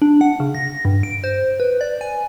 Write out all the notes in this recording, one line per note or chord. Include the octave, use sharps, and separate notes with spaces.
D4
F#5
C#3
A#6
G2
D7
C5
B4
D5
G#5